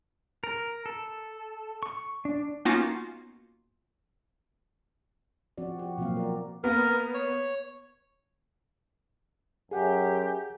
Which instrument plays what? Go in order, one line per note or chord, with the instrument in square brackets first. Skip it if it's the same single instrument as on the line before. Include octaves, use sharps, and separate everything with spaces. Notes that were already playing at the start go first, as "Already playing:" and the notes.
[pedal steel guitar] A#4
A4
C#6
D4
[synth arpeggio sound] A#3 B3 C#4 D#4 F4 F#4
[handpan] F3 C4 F#4 D5
F#4 G4
B2 F3 F#3 A#3 C4 F5
A#4 D5
[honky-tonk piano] A#3 B3 [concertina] A#4
[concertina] C#5
[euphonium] F#2 [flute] G4 [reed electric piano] G#4 F#5